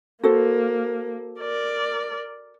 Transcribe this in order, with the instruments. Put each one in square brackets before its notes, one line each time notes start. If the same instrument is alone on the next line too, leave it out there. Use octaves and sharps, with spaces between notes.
[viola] A#3 [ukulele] F#4 A4 C5
[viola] A#4 D5